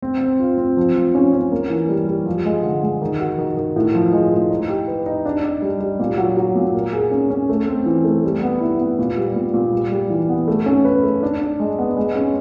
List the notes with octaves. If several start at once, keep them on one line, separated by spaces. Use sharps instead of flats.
C4
C4
F4
C4
F3
F3
C#4
C#4
A#3
E3
G3
G3
F3
G#3
D3
G#3
D#3
F#4
D#3
D#3
A2
F3
G#3
A2
D#4
G4
B4
D#4
D4
D4
G3
G3
A#2
F#3
F#3
A#2
A#3
G#4
C#4
C#4
A3
C4
E3
A3
G3
B3
E4
B3
A#2
G3
A#2
A#2
G3
G3
E3
B3
A3
C#4
B4
A3
D4
D4
G#3
B3
G#3
C#4